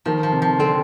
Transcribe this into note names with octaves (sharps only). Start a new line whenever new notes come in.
D#3 F3
F3
C3
F3
D3 C4